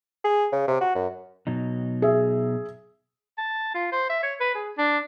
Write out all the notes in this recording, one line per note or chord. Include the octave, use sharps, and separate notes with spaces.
G#4
C#3
C3
F#4
F#2
B2 F#3 D#4
G#4 E5
A5
F4
C5
E5
C#5
B4
G#4
D4